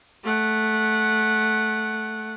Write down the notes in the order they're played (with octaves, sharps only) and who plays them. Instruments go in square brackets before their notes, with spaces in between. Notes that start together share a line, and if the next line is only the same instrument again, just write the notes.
[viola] A3 F#5